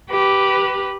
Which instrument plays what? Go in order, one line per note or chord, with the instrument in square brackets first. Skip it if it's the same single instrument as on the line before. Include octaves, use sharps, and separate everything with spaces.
[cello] G4 B4